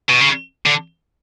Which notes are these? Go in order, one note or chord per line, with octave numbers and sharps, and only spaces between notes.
B2
C#3
D3